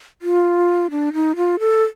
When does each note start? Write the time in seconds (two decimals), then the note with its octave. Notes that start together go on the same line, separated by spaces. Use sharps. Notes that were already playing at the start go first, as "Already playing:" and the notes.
0.22 F4
0.91 D4
1.13 D#4
1.36 F4
1.60 A4